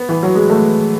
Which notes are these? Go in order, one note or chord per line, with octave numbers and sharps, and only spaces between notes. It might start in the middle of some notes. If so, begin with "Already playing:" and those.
Already playing: B3
E3
F#3
G#3
A3